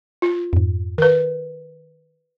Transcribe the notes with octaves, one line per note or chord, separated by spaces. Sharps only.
F4
F2 G#2
D#3 A#4 B4